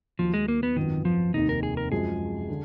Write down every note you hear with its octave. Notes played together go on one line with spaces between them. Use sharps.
D#2 D#3 F3 F#3
G#3
A#3
B3
G#1 F#2 D#3 F3 B3
F3
F1 D#2 D#3 D#4
A#4
G#4
A#4
F#2 F3 G#3 G#4
D3